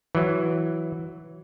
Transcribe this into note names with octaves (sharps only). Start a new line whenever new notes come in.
E3 F#3